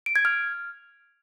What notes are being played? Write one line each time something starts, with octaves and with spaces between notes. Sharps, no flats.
D7
G#6
F6